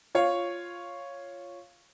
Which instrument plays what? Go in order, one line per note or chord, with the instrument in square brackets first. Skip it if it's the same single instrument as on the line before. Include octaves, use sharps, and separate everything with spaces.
[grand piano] F4 C#5 F5